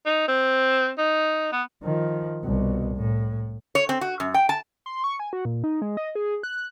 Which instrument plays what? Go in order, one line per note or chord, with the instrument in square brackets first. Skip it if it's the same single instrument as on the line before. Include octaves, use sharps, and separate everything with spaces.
[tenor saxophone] D#4
C4
D#4
B3
[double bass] D#3 F3
C2 B2
A2
[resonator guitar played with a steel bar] C#5
C4
F#4
F#2
G5
A5
[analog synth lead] C6
C#6
G#5
F#4
A#2
D#4
G#3
D#5
G#4
F#6